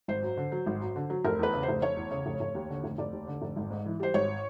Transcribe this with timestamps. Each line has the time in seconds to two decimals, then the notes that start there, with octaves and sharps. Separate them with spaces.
0.08 G#1 C5
0.23 F#2
0.37 D3
0.52 F#3
0.66 G#1
0.81 F#2
0.96 D3
1.10 F#3
1.24 F1 A#4
1.39 E2 B4
1.54 C#3
1.63 C5
1.68 F1
1.82 F1 C#5
1.97 E2
2.11 C#3
2.26 F1
2.40 F1
2.55 D#2
2.69 D3
2.84 F1
2.98 F1 D5
3.13 D#2
3.27 D3
3.42 F1
3.56 G#1
3.71 G#2
3.86 E3
3.99 G3 C5
4.14 G#1 C#5